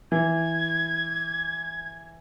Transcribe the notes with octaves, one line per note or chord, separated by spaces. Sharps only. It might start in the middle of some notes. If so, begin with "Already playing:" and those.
E3 G#6